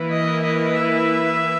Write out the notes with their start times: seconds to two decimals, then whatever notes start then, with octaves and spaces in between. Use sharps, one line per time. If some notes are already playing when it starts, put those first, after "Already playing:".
Already playing: E3 A#3 E4 B4
0.12 D#5
0.44 D#5
0.76 E5